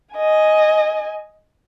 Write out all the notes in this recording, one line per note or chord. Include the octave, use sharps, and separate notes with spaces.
D#5 G#5